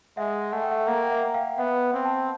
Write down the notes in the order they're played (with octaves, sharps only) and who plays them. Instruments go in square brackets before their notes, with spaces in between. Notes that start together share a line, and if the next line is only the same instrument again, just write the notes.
[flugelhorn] G#3 [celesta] E5 F#5
[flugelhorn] A3 [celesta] F#5
[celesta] G5
E5 F#5
[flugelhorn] A#3 [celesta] E5 F#5
[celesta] G5
E5 F#5
F5 G5
[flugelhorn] B3 [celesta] E5 F#5
[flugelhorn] C4
[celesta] G5 A5